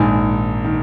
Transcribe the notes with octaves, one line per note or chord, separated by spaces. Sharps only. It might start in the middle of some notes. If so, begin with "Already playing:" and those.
Already playing: A#1 G#2 D#3 G#5
D#3